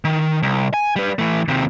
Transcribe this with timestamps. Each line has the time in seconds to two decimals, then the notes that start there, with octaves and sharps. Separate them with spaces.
0.04 D#3
0.43 C2
0.74 G#5
0.96 G3 B4
1.19 E3 A3
1.48 D#2 C3